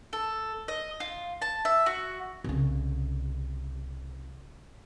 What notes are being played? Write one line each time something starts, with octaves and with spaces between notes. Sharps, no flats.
A4
D#5
F4
A5
E5
F#4
C2 C#3